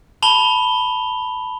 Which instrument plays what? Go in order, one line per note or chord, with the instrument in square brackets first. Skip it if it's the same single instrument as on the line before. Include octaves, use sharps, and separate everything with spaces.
[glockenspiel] A5 B5 F7 G7